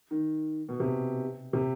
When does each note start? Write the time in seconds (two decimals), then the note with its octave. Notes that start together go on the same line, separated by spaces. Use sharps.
0.11 D#3
0.69 B2
0.80 C3
1.53 C3